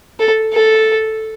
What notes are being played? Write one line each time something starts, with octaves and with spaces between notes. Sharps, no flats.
A4
A4